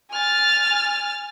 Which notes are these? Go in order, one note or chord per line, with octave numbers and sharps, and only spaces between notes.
G#5 F6 A6